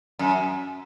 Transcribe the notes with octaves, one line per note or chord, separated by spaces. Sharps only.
F#2